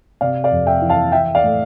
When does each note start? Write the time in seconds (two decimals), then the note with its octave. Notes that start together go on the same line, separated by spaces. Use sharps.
0.21 C3 D5 F5
0.44 D5 F5
0.51 F2
0.66 E5 G5
0.82 E3
0.89 F5 A5
1.12 E3 E5 G5
1.35 D5 F5
1.43 A2